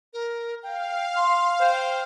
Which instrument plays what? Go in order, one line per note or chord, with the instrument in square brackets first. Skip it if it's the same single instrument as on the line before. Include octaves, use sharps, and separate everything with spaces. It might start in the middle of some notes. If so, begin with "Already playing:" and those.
[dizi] A#4
[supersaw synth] F5 [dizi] G5
[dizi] C6
[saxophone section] C5 [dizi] G5